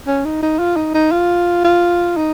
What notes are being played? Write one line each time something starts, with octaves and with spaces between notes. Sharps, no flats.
C#4
D#4
D#4
F4
D#4
D#4
F4
F4
D#4